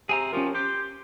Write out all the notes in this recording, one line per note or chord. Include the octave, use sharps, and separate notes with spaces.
C3 G#4 G#5 A#5
F3 C#4 G4 A#4
G4 C6